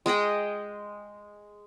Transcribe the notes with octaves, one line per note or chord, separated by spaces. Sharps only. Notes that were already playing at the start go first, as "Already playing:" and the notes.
G#3 G#4 D#5 G5